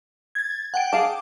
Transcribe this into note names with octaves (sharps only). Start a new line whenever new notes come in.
G#6 A6
F#5 G5 D7
G#4 F5 A5 D6